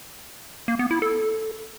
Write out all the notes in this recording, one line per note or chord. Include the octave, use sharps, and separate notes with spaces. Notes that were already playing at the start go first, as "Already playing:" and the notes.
A#3
B3
E4
A4